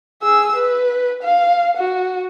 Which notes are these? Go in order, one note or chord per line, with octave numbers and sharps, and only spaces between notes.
G#4 E6
B4
F5
F#4